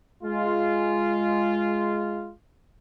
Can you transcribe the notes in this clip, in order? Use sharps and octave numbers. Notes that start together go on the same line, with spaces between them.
G#3 F4